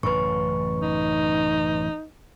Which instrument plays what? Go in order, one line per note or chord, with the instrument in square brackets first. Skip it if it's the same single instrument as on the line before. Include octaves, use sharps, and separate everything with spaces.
[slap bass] A1 F#2 C#3 [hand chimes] B4 C#6
[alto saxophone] D#4